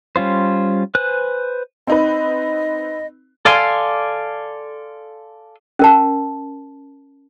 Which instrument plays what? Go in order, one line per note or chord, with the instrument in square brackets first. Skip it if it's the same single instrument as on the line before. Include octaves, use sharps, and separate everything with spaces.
[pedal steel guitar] G3 C#4 F4 C5
B4 C5 G#5 F#6
[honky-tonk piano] C4 D#4 B4 [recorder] D#5
[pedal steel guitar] A4 D5 F5 G#5 C6
[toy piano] C#4 A#4 A5